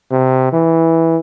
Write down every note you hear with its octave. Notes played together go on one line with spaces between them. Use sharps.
C3
E3